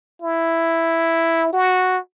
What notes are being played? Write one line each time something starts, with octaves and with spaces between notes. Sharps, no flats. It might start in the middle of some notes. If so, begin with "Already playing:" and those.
E4
F#4